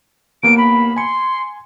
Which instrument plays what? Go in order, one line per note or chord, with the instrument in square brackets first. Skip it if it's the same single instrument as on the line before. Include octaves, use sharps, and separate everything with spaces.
[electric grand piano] D#2 A#3 B3 [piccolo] D7
[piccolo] B5
[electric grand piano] G#5 C#7 [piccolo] C6